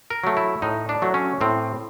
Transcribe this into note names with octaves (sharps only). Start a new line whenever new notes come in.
A#4
F#3 A3
E4
A2 D#4
D4
F#3 A3
C#4
A2 C4